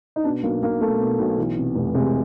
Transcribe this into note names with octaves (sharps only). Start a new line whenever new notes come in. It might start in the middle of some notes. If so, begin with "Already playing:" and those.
D#4
B2 D4
B1 A#3
B1 A#3
B1 A3
B2
B1
E3
C3
F1
C3 G#3